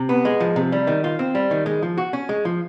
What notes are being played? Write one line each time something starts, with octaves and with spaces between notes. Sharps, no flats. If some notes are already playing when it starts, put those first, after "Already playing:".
Already playing: C3
B3
G#3
F3
C3
G3
D#3
F4
C4
G3
D#3
G#3
F3
F#4
C#4
G#3
F3